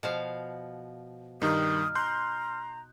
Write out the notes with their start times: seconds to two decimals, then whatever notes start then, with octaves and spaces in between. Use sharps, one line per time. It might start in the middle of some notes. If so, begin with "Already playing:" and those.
0.03 B2 F3 F5
1.42 G2 D#3 G3 D#4 D#6 F6
1.95 A#5 C6 F#6 G6